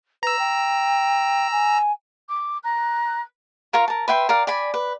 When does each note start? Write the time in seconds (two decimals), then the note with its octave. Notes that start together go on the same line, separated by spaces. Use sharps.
0.23 B4 A#5 E6
0.39 G5
1.52 G#5
2.30 D6
2.63 A#5 F#6
3.73 F4 A#4 F5 C#6
3.88 A#4 A5
4.08 B4 E5 G5 C6
4.29 A#4 D5 F5
4.47 D5 G#5 B5
4.74 B4